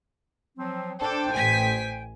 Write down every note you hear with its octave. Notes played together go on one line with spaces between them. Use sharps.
F3 F#3 C4
D4 A4 C5 G5
A1 G#5 B6